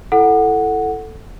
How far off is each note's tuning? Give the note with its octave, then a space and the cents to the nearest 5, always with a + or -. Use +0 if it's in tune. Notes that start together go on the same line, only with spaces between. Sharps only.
E4 +30 A4 +0 F#5 +0